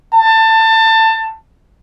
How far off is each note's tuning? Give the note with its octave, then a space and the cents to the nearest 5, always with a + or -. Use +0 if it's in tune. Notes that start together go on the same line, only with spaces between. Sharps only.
A5 +20